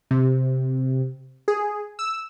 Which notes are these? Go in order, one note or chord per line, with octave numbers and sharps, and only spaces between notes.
C3
G#4
E6